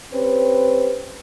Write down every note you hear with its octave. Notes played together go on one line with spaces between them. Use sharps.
C4 C#4 G4 B4